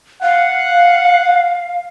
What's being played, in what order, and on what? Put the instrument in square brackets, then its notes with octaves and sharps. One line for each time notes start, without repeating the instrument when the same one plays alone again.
[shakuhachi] F5 [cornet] F#5